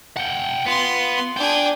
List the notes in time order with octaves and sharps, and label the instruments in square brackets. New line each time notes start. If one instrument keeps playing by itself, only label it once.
[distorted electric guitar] F#5 G5
[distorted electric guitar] B3 [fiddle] F4 C6
[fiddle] D4 G#4 [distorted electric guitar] G5